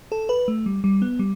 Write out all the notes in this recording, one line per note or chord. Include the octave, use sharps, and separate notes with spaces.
A4
B4
A3
G3
G3
B3
G3